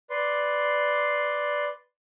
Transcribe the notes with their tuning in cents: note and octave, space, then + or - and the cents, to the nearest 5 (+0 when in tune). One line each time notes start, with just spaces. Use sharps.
B4 +5 D5 +0 C6 +0